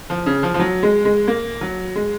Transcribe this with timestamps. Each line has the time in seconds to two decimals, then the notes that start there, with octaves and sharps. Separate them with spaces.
0.10 F3
0.26 C#3
0.43 F3
0.54 F3
0.59 F#3
0.83 G#3
1.05 G#3
1.28 A#3
1.61 F#3
1.96 G#3